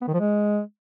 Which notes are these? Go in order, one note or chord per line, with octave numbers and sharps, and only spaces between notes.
B3
D#3
F3
G#3